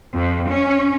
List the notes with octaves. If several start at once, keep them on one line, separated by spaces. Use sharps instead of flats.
F2
C#4